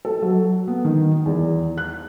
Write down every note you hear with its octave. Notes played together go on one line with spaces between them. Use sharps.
A4
F#3
B3
D#3
E2
F#6